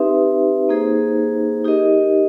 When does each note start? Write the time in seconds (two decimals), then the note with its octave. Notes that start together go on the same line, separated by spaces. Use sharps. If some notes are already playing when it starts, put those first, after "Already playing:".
Already playing: C4 D#4 G4 B4 E5
0.69 A#3 D#4 G#4 C5
1.65 D#4 G4 A#4 D#5